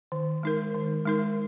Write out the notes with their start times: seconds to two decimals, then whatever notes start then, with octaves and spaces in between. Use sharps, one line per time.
0.12 D#3
0.43 G#3 D#4 A#4
0.75 D#3
1.05 G#3 D#4 A#4